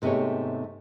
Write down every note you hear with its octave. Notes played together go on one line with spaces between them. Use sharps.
G#2 C3 A3 B3 G#4 C#5